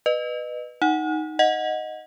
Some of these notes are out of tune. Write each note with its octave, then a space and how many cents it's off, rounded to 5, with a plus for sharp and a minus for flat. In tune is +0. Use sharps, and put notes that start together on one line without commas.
B4 +0 D#5 -25
D#4 +0 F#5 +0
D#5 +0 F#5 -10